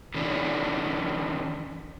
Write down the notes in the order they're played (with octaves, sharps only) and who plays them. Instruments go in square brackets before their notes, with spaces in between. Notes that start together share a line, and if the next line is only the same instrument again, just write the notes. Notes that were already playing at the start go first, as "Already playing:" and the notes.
[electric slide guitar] D#3 E3 C#4 D4